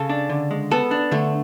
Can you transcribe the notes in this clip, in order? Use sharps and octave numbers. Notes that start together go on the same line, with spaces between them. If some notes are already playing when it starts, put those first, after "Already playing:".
Already playing: C#3 C#4 A4
D4
D3
G#3
B3 A4
D4
D3 A3